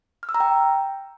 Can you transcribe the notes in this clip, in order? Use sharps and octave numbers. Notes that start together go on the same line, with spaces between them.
F6
E6
A#5
G5